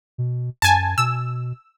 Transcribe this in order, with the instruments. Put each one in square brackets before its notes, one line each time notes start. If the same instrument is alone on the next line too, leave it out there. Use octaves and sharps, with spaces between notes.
[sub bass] B2
[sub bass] F#2 [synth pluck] G#5 A5
[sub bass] B2 [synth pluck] E6